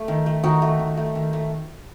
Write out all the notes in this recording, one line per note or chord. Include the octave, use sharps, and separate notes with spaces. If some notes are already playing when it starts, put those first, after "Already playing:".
Already playing: A3
D#3
A3
D#3 D#4 F#4
A3
D#3
A3
D#3
A3